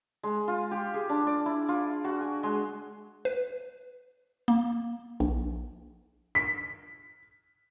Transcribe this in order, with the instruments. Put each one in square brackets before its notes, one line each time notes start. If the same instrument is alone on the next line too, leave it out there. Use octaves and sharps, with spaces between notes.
[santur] G#3
F4
G4
G#4
D4
D5
E4
F4
F#4
G#5
G#3
[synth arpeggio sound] B4
A#3
A#1
[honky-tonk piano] B6